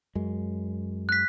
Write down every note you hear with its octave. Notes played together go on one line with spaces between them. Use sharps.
F#2 G#3
F#6 B6